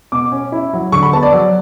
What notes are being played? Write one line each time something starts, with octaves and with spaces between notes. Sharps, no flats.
B2 D6
C#4
E4
F#3
D3 C#6
B5
B3 A5
D5
F#3